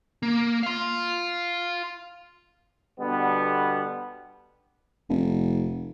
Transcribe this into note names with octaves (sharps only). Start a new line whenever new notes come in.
A#3
F5 C6
B2 D3 G3 B3
F1